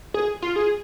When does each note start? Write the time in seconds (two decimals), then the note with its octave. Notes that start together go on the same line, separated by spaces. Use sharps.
0.14 G#4
0.42 F4
0.56 G#4